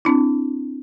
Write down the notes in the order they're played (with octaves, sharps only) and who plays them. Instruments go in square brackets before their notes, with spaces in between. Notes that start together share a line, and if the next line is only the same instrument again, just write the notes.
[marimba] C4 D4 E4